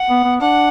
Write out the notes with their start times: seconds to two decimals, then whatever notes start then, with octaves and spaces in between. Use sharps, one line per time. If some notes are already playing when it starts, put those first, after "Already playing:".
Already playing: F#5
0.10 B3
0.24 B3
0.40 D4 F#5